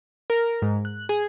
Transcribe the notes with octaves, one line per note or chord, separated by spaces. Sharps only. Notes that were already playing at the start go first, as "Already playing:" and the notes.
A#4
G#2
F#6
G#4